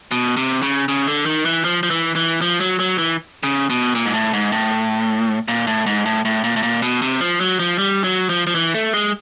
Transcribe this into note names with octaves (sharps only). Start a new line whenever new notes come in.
B2
C3
C#3
C#3
D3
D#3
E3
F3
F3
E3
E3
F3
F#3
F#3
E3
C#3
B2
A#2
G#2
A2
G#2
A2
A#2
A2
G#2
A2
A2
A#2
A2
A#2
B2
C3
F3
F#3
F3
G3
F#3
F3
F3
E3
A3
G#3